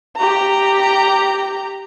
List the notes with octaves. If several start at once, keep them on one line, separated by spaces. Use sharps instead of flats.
G4 A#5